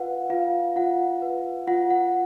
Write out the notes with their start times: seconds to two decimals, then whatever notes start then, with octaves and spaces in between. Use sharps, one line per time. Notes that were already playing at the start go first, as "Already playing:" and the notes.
Already playing: F4 B4 F5 F#5
0.30 F4 F5
0.76 F4 F#5
1.22 B4
1.67 F4 F#5
1.90 F#5